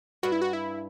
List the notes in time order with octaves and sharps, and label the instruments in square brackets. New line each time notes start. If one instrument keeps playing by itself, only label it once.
[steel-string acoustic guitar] G2 [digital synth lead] F#4
[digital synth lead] E4
F#4
E4